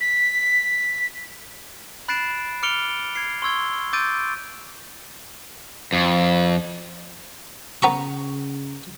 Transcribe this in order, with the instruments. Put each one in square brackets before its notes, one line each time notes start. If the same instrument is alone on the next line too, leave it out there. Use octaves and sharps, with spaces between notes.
[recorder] B6
[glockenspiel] B5 F#6 A6 C7 D7 E7
D6 F6 C#7 D7 F7 G7
G#6 C7
C6 C#6 E6 G#6 G7
D6 E6 G6 A6 D7 D#7
[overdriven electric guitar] F2
[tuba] C#3 [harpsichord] B3 A#5 C#6